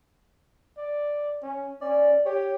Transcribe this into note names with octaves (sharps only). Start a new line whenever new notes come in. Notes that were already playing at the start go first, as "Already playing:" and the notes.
D5
C#4
C#4 D5
G4 C#5